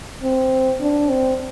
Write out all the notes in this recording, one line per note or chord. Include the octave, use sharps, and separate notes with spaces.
C4
D4
C4